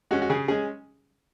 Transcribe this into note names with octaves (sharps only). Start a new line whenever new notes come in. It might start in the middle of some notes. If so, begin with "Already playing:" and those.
G#3 C#4 F#4
F#4
C#3 G#4
G#3 C#4 G#4